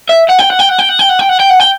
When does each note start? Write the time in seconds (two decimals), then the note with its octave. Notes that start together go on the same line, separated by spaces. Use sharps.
0.09 E5
0.29 F#5
0.39 G5
0.49 F#5
0.59 G5
0.69 F#5
0.79 G5
0.89 F#5
0.99 G5
1.09 F#5
1.19 G5
1.29 F#5
1.40 G5
1.50 F#5
1.60 G5